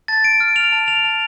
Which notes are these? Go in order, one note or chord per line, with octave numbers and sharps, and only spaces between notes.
A5 A6
D7
F6
F7
A5
F7
A5